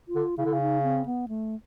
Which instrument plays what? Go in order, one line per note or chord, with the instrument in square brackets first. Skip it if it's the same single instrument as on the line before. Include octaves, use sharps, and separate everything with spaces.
[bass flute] F4
[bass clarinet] D3
[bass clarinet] C#3 [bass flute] E4
[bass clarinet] D3
C#3
[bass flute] D#4
C4
B3
A3